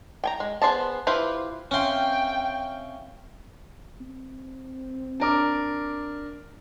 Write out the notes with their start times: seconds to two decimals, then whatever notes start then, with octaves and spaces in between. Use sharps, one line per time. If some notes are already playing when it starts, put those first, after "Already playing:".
0.24 G5 G#5 A#5
0.40 G#3
0.62 B3 G#4 C5 D#5 A5
1.07 E4 F4 G4 B4 C5
1.71 C4 C#4 E5 F5 G5 C6
4.01 C4
5.20 D4 A#4 D6